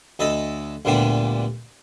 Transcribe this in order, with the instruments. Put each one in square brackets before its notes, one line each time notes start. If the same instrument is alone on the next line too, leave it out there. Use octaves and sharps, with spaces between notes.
[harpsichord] D2 A4 D#5 B5
D2 A#2 D3 G3 B3 B5